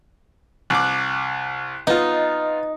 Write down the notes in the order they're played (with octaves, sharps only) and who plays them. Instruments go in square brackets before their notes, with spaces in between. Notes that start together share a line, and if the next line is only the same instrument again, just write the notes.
[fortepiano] C2 D6 [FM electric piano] F#6
[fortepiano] B3 F4 [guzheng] D#4 [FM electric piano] D#5